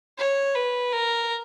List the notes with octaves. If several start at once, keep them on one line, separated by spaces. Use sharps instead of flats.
C#5
B4
A#4